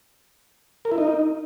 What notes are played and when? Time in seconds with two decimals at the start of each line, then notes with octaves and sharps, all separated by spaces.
0.85 A#4
0.91 E4
0.98 D#4